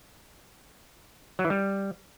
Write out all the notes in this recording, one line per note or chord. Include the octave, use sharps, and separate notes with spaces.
F#3
E3
G3